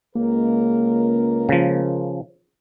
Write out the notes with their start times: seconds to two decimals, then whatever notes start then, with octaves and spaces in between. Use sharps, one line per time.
0.15 C#2 A#3 A#4
1.49 C#3 F3